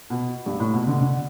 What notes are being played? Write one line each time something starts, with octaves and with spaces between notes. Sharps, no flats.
B2
G2
A2
B2
D3
D3